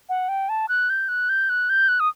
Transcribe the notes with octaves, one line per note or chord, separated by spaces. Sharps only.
F#5
G5
A5
F#6
G6
F#6
G6
F#6
G6
F#6
D#6